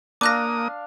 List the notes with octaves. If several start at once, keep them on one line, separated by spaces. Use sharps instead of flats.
A#3 D4 F5 D6 D#6 F#6 A#6